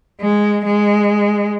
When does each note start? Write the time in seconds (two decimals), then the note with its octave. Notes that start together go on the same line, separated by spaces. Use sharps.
0.21 G#3
0.65 G#3